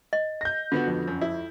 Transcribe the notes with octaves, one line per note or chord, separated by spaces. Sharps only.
D#5
G6 A#6
D3 B3 F4 F#4
F2
F#2
E4